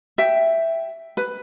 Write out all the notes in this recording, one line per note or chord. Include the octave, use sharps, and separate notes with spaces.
E5 G5
B4